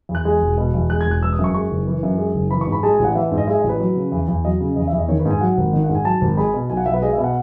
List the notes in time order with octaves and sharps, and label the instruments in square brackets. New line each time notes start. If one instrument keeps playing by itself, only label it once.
[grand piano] E2
F#6
G#3
E1
B2
E2
G#3 F#6
G#6
E1
F#6
E3 E6
D#6
F#2
C#6
G#3 C#6
F#1
E3
F#2
G#3
F#1
E3 B5
C#6
G#2
B5
G#3 A5
G#5
A1
F#5
E3 E5
G#2
D#5
G#3 E5
D#5
A1
B4
F#3
C#3
E2
E2
F#3 D#5
C#3
E2 D#5
E5
E2
D#5
D#3 C#5
B4
G#2
G#5
F#3 F#5
G#1
D#3
F#5
G#2
G#5
F#3 A5
G#1
G#3 B5
B2
B1 G#5
F#5
B1 E5
B4
G#3 D#5
E5
B2
F#5